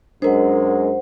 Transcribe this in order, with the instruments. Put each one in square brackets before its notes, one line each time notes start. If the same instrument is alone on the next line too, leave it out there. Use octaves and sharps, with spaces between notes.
[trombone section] F#2 G#3 [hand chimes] D4 A#4 [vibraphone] C5 F#5